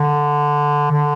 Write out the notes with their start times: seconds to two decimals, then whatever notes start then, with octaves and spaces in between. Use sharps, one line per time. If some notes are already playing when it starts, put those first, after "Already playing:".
Already playing: D3
0.92 D3